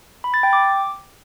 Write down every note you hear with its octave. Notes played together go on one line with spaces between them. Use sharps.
B5
A6
G5
D6